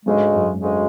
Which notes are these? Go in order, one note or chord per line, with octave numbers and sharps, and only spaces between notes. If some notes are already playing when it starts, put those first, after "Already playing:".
D2 G#2 C#3 G#3
F#2
D2 C#3 G#3